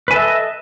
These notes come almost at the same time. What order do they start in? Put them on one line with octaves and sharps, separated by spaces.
B4 G#5 A4 E5 D#5